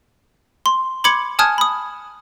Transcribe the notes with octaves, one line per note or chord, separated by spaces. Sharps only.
C6
B5 C6 D6 G#6 C#7 F#7
G#5 A5 D#6 F6 F#6 G#6
B5 D#6